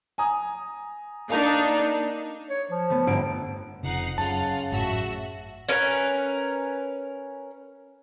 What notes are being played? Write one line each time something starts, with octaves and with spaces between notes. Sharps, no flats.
G#5 A#5 D#6
A#3 D4 D#4 F5 A5
C#5
F3
A3 B3
G1 D7
F1 F2 C#3 D#4 F#5 C7
F#2 C#3 F4 F#5 A5
G#1 F#2 A2 F#4 E5
C#4 A#4 B4